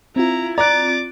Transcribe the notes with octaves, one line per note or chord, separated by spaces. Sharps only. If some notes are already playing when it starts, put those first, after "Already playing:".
C4 E4 F4 A#5
D5 A#5 D6 F#6 A6